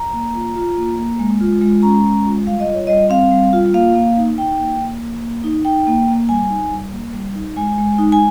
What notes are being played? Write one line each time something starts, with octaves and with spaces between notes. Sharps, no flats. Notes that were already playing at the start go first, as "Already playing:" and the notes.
Already playing: A#5
A#3
F4
F4
A#3
A#3
G#3
F4
G#3
C#4 A#5
G#3
F4
G3 F5
D#5
F4
C#5
G3 D#5
C4 F5
G3
F4
A#3 F5
A#3
D#4
D#4 G5
A#3
A#3
A#3
A#3
D#4
D#4 G5
A#3
A#3
G3 G#5
D#4
G3
A#3
G3
D#4
G#3 G#5
G#3
D#4
G#5